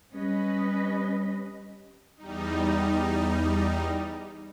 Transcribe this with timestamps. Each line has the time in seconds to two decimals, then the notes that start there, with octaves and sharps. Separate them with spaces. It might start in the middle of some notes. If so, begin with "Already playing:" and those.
0.15 G3 C#4 B4 D#5
2.17 E2 G3 D#4